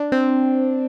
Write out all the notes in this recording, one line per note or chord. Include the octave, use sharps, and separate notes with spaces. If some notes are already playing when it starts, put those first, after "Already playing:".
Already playing: D4
C4